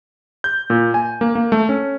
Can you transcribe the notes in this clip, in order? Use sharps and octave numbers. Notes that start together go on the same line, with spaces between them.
G6
A#2
G#5
A#3
A#3
A3
C#4